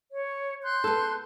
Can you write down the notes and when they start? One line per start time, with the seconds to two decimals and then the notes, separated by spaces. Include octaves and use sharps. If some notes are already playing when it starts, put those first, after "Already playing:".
0.11 C#5
0.63 C6 F#6 G6
0.84 B3 A4